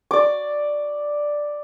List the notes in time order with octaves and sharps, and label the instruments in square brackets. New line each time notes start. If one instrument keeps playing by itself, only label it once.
[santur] D5 D6